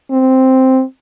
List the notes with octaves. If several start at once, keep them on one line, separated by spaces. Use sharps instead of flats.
C4